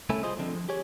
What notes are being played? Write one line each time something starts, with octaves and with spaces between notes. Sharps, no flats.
C2 A3 C#4 E4 A4 G#5
F4 G#4 C5 D#5
D3 F3 C4
F3
G4 G#4 C#5